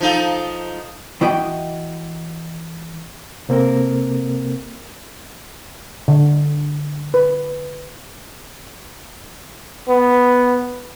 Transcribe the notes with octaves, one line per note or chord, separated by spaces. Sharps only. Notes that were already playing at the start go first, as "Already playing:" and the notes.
F3 D#4 A4
E3 E4 F#4 D#5 G5
C3 A#3 C4 A4 A#4
D3
B4
B3